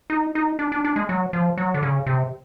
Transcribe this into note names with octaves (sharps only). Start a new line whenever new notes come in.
D#4
D#4
D4
D4
D4
G#3
F#3
F3
F#3
D3
C#3
C3